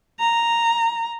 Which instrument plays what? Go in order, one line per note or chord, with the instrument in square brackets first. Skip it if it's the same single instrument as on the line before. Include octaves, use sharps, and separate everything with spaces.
[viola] A#5